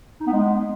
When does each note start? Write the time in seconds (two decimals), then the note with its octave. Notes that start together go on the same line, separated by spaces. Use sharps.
0.21 D#4
0.26 B3
0.32 G#3